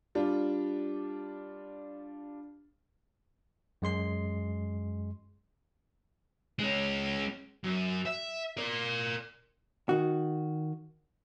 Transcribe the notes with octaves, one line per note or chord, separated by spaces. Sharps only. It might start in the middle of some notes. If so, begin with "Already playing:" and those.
G3 D4 F4
F#2 G#3 C6 C7
G#3 C#4
F#2
E5
A#4 D5
D#3 F#4